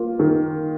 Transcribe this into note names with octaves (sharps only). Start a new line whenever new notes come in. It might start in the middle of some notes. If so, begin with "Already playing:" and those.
Already playing: A#3 F4
D#3